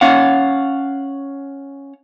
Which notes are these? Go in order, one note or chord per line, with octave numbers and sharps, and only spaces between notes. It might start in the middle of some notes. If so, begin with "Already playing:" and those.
C#4 F5 F#5